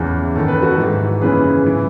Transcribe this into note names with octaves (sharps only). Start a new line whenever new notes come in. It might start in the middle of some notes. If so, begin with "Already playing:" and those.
Already playing: E2 C#3 E3
F#2 D#3 A4
B4
F#4 A4
G#2 E3
F#2 C#3 E3 G#4 B4
E3